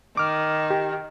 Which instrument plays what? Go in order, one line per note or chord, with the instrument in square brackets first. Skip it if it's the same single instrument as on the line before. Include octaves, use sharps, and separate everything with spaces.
[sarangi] D#3 [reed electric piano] D6 F6
[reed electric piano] G4